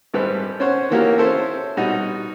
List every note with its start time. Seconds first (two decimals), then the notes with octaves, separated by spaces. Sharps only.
0.14 G#1 G3 G4 A4 B4 C5
0.60 C#4 C5 C#5 F#5
0.90 D#3 E3 A#3 F#4 G4 A#4
1.17 C#4 E4 A4 C5 C#5
1.77 B2 G3 D#4 F#4